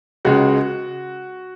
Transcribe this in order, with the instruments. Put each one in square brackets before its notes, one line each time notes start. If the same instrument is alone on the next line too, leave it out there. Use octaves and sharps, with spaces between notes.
[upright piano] C#2 C#3 G#3 F#4